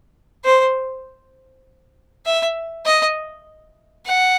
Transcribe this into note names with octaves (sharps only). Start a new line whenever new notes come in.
C5
E5
D#5
F#5